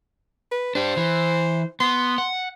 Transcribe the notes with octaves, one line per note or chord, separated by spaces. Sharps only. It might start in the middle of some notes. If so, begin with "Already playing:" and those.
B4
D4 G4 C5
E3
B3 C6
F#5